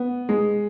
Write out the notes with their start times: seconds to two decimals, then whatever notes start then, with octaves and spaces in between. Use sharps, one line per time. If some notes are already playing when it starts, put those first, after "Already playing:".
Already playing: B3
0.29 G#3